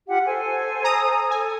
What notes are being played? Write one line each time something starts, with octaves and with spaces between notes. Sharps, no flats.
F4 G4 F#5
A4 C5 G#5
A#5 D#6
A4 G#5